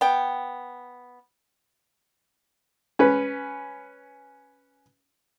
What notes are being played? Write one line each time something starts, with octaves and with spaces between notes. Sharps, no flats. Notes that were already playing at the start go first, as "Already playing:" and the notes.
B3 G5
C#4 B4